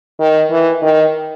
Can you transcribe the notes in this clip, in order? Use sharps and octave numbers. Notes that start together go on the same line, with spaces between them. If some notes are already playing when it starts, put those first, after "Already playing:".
D#3
E3
D#3